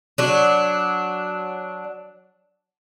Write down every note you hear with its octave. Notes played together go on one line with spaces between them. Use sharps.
F#3 D4